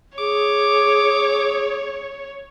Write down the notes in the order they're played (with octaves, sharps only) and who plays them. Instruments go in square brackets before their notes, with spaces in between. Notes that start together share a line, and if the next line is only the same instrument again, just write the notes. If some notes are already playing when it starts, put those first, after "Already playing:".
[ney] G#4 [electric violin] C#5 [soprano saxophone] D6